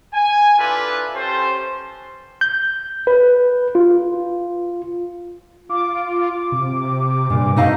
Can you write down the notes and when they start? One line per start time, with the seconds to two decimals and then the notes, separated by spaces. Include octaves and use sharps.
0.14 G#5
0.58 D4 E4 F4 G4 A4 B4
1.15 C#4 G4 A4 C5
2.41 G6
3.07 B4
3.75 F4
5.69 F4 D6
6.52 C3
7.30 G2 A#2
7.56 B2 A3 D#4 F5